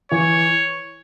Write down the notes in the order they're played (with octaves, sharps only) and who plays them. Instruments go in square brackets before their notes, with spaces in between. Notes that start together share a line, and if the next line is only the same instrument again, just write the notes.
[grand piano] E3 [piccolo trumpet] C#5